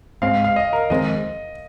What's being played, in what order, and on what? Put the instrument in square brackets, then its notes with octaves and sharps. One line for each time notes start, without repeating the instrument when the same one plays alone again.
[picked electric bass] G#2 G#3 C4 [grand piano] F5
[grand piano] F5
D#5
A#4
[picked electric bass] F2 D#3 G#3 C4 [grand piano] D#5